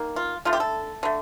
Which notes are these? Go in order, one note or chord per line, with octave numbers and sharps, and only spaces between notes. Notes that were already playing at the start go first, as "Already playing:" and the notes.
Already playing: D#3 A#3
F4
D3 A3 F4
G4
A4
D3 A3